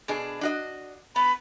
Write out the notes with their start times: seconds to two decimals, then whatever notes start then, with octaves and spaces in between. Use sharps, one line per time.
0.08 B2 D4 G#4
0.41 D4 F#4 D#5
1.16 B3 B5